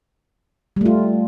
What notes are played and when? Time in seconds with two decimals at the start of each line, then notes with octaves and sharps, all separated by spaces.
0.76 G3
0.81 A3
0.86 F4